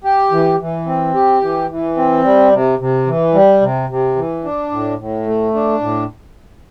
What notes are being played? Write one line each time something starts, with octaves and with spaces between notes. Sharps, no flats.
G4
E3
E3
C4
G4
E3
E3
C4
G3
C3
C3
E3
G3
C3
C3
E3
D4
A2
A2
A3
D4
A2